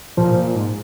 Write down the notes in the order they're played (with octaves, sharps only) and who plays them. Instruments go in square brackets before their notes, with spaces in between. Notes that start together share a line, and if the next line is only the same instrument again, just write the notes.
[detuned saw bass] A#2 [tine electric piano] F3
[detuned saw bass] A#2
G#2